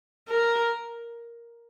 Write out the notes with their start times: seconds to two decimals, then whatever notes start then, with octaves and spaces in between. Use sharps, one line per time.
0.29 A#4